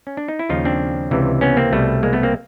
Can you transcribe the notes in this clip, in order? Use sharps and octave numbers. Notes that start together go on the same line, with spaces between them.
C#4
D4
D#4
E4
D#2 C#3 F3 D#4 F4
C4 D4
C#2 C3 E3
B3 C#4
A#3 C4
C2 B2 G3 A3
G#3 A#3
A3 B3
A#3 C4